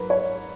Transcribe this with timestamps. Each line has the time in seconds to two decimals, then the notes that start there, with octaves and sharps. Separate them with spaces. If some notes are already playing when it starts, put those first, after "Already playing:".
Already playing: G#2 F#3 A#4 B4
0.10 C#5